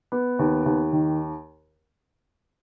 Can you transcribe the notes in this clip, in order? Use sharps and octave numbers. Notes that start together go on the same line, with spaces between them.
B3
D#2
D#2
D#3